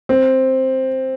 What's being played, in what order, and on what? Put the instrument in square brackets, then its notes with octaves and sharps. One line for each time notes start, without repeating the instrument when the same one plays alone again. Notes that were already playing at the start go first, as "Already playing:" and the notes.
[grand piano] C4